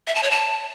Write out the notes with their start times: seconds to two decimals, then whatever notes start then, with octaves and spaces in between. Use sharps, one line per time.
0.07 E5
0.15 A5
0.23 C#5
0.31 A5